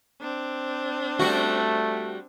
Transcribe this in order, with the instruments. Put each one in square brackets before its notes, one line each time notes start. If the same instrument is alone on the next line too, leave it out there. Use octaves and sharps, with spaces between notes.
[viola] C4 D4
[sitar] G3 F#4 [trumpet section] A3